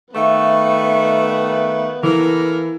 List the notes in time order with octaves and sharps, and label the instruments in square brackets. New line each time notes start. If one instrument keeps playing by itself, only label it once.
[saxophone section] D#3 A3 [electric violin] B3 B4 [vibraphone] E5 F5 C#6
[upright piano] E3 [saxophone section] A#3 A4 A#4